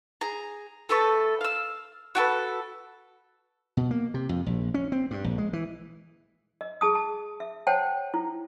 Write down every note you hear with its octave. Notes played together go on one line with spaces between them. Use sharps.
G#4 A#5
A3 A4 B4 C#6
F5 E6
F#4 G4 A4 B4
B2
A#3
C3
F2
A#1
C#4
C4
G2
A#1
G#3
E3
D#5
G#4 A5 D#6
A5
E5
C5 C#5 F#5 G5 A5
E4